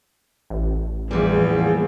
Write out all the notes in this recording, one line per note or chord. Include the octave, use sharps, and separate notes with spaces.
A1
E2 A2 E3 F3 G3 A#3 B3 G#4